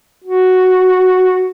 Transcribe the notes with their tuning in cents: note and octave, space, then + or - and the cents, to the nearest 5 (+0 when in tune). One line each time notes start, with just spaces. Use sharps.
F#4 +0